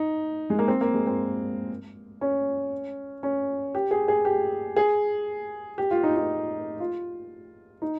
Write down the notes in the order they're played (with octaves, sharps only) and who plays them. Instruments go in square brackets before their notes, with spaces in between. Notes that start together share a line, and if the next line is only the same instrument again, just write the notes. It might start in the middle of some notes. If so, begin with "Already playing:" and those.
Already playing: [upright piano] D#4
G#3
A#3
C4
A#3
G#3
C4
C#4
C#4
G4
G#4
G#4
G4
G#4
G4
F4
D#4
D#4
F4
D#4